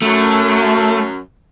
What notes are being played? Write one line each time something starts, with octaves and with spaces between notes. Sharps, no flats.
F#2 A3